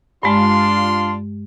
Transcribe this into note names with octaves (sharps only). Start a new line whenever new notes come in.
G2 G#3 D4 F4 C6